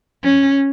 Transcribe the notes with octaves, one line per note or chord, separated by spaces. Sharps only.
C#4